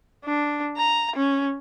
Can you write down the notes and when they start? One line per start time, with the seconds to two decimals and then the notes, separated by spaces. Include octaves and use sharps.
0.24 D4
0.77 A#5
1.16 C#4